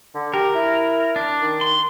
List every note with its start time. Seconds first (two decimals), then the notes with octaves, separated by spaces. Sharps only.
0.14 D3
0.34 G4 A#4
0.55 E4
1.16 D4
1.41 D#3
1.61 C6